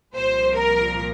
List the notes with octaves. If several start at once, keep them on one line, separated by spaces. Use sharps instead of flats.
C2 A#2 F3 C5
A#4